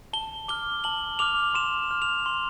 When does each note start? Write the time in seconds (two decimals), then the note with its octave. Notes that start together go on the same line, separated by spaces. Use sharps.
0.13 A5 G7
0.48 D6 F6 G7
0.84 A5 F#7
1.19 D6 F6 F7
1.54 C6 E7
1.91 F6
2.02 F7
2.26 C6